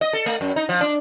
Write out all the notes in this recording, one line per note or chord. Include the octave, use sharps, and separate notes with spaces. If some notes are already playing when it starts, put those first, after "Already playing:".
D#5
A4
A3
F#2
D#4
F3
D4